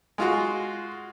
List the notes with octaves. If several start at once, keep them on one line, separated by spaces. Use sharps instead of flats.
G#3 F4 F#4